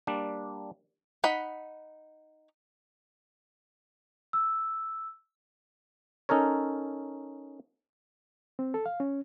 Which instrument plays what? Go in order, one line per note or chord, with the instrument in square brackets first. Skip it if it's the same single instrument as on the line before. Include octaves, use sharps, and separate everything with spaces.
[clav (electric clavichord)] G3 A#3 D4
[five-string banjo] D#4 F#5 B5
[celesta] E6
[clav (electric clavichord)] C#4 D#4 A4 A#4 C#5
[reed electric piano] C4
A4
F5
C#4